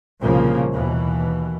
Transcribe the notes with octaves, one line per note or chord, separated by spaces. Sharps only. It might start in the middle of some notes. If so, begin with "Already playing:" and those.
C2 A#2 C#3 F3 A#3
D#2 B2 E3